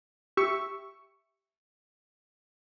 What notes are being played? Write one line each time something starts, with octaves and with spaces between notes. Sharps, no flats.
G4 E5 C#6